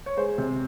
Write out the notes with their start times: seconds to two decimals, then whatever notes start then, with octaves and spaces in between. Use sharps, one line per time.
0.06 C#5
0.17 G#3 C5
0.38 C3